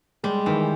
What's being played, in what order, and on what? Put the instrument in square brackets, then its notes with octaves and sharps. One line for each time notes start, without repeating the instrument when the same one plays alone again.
[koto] G3 [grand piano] G#3
[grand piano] D#3 [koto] E3